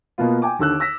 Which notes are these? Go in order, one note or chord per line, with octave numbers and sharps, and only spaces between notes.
B2 A#3 B3 F4
G5 G#5 D6
D#2 D3 E6 F#6
E6 A#6 B6